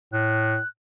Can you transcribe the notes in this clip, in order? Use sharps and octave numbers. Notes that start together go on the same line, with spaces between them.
A2 F#6